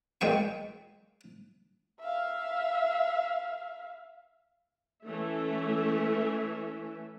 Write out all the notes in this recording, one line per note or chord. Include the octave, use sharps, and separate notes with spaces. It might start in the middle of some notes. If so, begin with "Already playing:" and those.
A#2 G#3 G5 C#6
E5 F5
E3 A3 C#4 E5